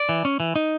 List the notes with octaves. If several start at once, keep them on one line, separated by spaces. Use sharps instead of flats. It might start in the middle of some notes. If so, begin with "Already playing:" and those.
Already playing: D5
E3
C#4
E3
D#4